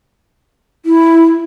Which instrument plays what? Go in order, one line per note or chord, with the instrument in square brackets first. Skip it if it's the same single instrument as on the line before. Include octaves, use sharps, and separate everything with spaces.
[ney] E4